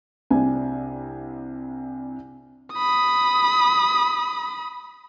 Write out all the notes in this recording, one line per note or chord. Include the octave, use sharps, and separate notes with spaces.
C2 C3 D4 G#5
B5 D#6